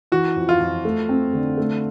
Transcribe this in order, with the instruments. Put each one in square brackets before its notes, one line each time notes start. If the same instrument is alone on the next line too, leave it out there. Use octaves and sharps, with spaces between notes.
[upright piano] E3 [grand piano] F#4
[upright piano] F2
[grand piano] F4
[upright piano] F2
A3
C4
D3
A3